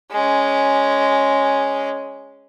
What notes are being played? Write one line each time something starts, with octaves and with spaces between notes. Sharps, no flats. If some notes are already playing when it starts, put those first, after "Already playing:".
G#3 C#4